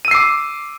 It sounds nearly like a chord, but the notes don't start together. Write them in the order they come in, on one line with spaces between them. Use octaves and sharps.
D#7 E6 C7 D6